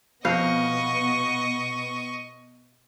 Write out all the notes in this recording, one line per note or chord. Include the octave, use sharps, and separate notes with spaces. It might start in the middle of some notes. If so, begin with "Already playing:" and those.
F2 B2 B3 D#5 F5 C#6